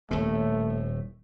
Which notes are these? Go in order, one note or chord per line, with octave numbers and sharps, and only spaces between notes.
D#1 A2 A3